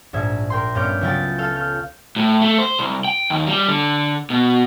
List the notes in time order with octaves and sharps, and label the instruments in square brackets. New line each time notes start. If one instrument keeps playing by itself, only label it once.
[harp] A#1 G#2 E5 G#6
A#4 G5 C6
G2 B3 C#4 D6 F6 G6
C#2 F#3 E4 F4 G5 A6
A4 F5 E6 G6
F6 G6
[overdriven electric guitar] A2
A3
C5
C2
G5
D#2
G3
D3
B2